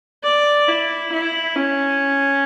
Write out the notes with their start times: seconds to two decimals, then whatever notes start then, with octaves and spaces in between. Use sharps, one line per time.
0.24 D5
0.68 E4
1.12 E4
1.55 C#4